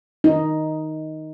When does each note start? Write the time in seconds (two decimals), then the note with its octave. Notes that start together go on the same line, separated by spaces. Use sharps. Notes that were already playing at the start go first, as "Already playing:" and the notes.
0.24 D#4